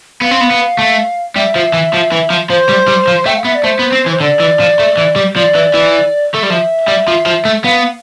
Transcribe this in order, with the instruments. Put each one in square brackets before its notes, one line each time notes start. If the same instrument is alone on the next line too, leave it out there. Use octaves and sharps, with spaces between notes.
[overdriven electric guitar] B3 [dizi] F5
[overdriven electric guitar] C4
B3
B3
A3
[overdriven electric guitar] G3 [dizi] E5
[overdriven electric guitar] F3
E3
F3
E3
F3
[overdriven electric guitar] F3 [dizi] C5
[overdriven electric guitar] G3
G3
F3
[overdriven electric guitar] A3 [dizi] G5
[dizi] F5
[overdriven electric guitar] B3 [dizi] E5
[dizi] D5
[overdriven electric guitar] A3 [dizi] C5
[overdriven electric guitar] B3
C4
E3
[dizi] C5
[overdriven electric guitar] D3 [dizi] D5
[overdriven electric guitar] E3
F3
A3
E3
G3
[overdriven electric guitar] F3 [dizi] D5
[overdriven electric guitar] E3
E3
A3
G3
[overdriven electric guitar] F3 [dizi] E5
[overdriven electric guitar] G3
F3
F3
A3
[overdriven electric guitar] B3 [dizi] F5